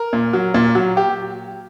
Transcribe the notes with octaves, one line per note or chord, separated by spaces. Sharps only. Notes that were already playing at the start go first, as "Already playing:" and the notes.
Already playing: A#4
A#2
F#3
A#2
F#3
G4